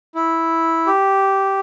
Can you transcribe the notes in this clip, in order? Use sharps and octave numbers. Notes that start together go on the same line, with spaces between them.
E4
G4